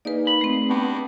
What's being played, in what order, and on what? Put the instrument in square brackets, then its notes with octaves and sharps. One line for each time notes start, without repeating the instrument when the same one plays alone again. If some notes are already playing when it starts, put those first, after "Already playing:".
[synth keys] A#3 D#4 G#4 [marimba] B4 D5
[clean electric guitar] B5
[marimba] A3 C4
[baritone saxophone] G2 [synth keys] B3